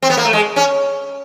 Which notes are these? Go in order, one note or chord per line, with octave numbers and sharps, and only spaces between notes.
C4
B3
A#3
A3
G#3
C#4